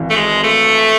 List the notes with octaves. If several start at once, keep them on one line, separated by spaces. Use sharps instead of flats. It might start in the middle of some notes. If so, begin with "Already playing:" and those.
Already playing: G#1 E3
A3
G#3
A3